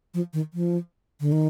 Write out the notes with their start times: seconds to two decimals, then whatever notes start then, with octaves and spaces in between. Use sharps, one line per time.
0.14 F3
0.33 D#3
0.54 F3
1.21 D3
1.32 D#3